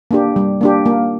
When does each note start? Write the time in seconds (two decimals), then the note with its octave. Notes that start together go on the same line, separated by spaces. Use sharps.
0.11 A#3 D4 G4
0.36 G3
0.61 A#3 D4 G4
0.86 A#3